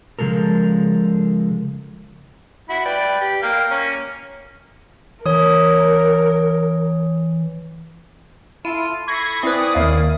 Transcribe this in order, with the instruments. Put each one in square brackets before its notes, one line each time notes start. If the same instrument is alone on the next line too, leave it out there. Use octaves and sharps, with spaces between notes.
[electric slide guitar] C#3 F3 G#3 A4 A#4
[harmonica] E4 F#4 B5
B4 D5 G5
G4
A#3 F5 G5
A#3 C#4
[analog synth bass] E3 [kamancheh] A#4 [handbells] C#5 D#6
[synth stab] E4 [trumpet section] F4 A4 [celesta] D#7
[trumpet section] A4 B5 C#6 [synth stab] G#6 A#6 C7
[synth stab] C4 B4 [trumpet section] C#4 D5 D#6 [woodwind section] E4
[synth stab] D#2 F5 [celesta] A#4 E5